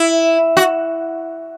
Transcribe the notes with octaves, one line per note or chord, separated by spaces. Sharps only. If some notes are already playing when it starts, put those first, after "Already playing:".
Already playing: E4
F#4